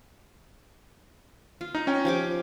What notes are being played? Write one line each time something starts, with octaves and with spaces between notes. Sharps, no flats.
F4
D#4
C#4 G5
F3 G4 D6